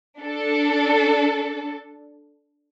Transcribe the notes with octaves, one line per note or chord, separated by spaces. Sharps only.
D4 A4